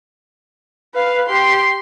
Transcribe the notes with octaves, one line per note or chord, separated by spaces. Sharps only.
B4 F5
G4 C6